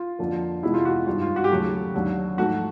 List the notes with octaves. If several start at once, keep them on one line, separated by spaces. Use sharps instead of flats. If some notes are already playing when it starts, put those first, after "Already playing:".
Already playing: F4
F2 D3 F3 A#3
F2 C3 E3 G#3 B3 E4
F4
F#4
G2 D#3 G3 F4
F4
F#4
G4
D#2 C#3 F#3 A3 F#4
D#2 D3 F#3
G#2 F3 A3 F#4